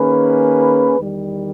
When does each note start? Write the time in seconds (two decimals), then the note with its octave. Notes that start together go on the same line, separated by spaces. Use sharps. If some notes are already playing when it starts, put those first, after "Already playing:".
Already playing: D#3 A#3 C#4 G#4 B4
0.99 E2 D#3 G3